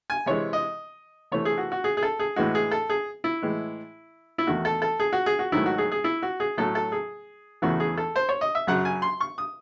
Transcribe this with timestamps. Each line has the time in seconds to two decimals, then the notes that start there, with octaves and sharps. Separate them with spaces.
0.10 G#5
0.26 C3 E3 G#3 C#5
0.53 D#5
1.32 C3 E3 A3 C#5
1.45 G#4
1.58 F#4
1.72 F#4
1.84 G#4
1.97 G#4
2.03 A4
2.19 G#4
2.36 A2 E3 G#3 F#4
2.55 G#4
2.71 A4
2.90 G#4
3.24 E4
3.42 A2 E3 G#3
4.38 E4
4.47 E2 D#3 A3 F#4
4.65 A4
4.82 A4
5.00 G#4
5.13 F#4
5.26 G#4
5.39 F#4
5.52 G#2 D#3 F#3 A3 E4
5.66 F#4
5.78 G#4
5.92 G#4
6.04 E4
6.23 F#4
6.40 G#4
6.58 A2 F#3 A3 A4
6.75 A4
6.92 G#4
7.62 E2 C#3 E3 A3 F#4
7.80 G#4
7.97 A4
8.16 C5
8.29 C#5
8.41 D#5
8.55 E5
8.67 F#2 C#3 F#3 F#5
8.85 G#5
9.02 C6
9.20 C#6
9.38 D#6